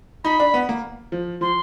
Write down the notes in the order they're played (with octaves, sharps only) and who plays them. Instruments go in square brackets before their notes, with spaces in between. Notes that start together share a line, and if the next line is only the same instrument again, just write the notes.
[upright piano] D#4 [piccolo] B5
[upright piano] D4
B3
A#3
F3
[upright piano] F3 [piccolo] C6